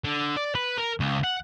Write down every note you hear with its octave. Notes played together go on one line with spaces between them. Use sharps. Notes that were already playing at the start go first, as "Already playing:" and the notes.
D3
D5
B4
A#4
C#2
F#5